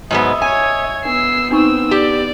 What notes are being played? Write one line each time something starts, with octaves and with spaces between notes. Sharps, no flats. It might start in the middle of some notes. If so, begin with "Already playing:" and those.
G#2 F#3 B3 D#5 E5
C#5 G#5 G#6
B3 D4 E6 C7
C4 D4 D#4 C#6 E6
G4 D5